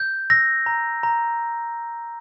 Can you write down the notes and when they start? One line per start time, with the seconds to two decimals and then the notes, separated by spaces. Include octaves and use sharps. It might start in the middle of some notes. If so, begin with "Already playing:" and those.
Already playing: G6
0.30 E6 A#6
0.66 A#5
1.03 A#5